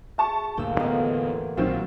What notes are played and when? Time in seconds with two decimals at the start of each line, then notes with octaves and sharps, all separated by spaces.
0.18 G#4 E5 A5 C#6
0.57 G1 D2 A#2 A#3 G5 E6
0.80 A1 E2 D3 B3 D#5 F5
1.57 A#1 D#3 F#3 C4 F4